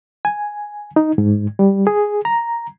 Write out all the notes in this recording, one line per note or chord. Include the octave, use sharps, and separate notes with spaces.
G#5
D#4
G#2
G3
G#4
A#5